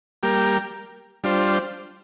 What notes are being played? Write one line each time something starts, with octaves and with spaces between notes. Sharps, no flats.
G3 A#3 G4 A#4
G3 D4 F4 C5